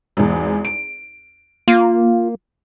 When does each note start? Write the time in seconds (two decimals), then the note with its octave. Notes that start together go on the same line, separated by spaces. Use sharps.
0.17 G#1 E2
0.65 D7
1.68 A#3 F4